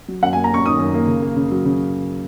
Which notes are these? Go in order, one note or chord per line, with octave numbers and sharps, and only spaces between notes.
F#3
F#2 F#5
G#5
A#3
A#5
C#4 C#6
D#3 D#6
F#2
A#3
C#3
A#3
C#3
F#3
C#3